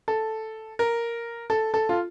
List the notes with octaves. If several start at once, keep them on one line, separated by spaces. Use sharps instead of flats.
A4
A#4
A4
A4
F4